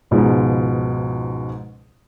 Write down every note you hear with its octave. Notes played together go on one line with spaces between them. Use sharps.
C#2 G#2 B2 F3 G#3